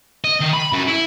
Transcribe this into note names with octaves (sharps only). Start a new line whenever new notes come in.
D#5
D#3
B5
F#2
E4